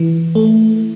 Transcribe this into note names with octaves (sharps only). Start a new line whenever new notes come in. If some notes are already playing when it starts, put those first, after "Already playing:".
Already playing: E3
A3